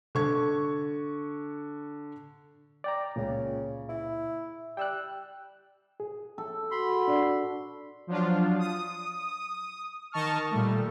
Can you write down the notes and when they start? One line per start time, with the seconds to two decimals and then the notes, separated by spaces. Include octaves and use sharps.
0.15 D3 C#6 G#6
2.84 D5 G5 A#5
3.16 C#2 A#2 C#3
3.89 E4
4.77 G3 G5 E6 F#6
6.00 G#4
6.38 A4
6.71 F#4 B5 C6
7.08 D4 D5
8.07 F3 F#3 D4 F4
8.59 D#6
10.12 D#3 D#5 A5 C#6 F6
10.51 A#2 G3 A3